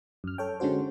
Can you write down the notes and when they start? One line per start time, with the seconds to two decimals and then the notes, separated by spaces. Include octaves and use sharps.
0.24 F#2 F6
0.38 A4 C#5 G5
0.60 D3 G#3 C#4 F#4 C5